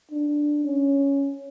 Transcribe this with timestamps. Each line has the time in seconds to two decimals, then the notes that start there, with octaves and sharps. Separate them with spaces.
0.12 D4
0.64 C#4